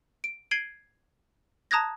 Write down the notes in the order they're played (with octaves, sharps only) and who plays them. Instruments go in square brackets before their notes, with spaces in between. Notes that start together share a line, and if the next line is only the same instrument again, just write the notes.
[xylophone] D7
G#6 C7 D7 D#7 F#7 G7
A5 A#5 D#6 F#6 G#6 A#6